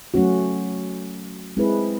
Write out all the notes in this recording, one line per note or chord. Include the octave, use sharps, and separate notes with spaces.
F#3 A3 C#4 F#4
G#3 C4 E4 G#4 B4